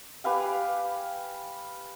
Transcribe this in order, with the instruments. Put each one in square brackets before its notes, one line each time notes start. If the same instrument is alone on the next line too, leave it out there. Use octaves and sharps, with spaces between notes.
[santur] G4 B4 F5 G#5